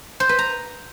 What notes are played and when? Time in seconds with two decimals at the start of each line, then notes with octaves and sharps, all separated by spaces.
0.20 C5
0.29 B4
0.38 A#5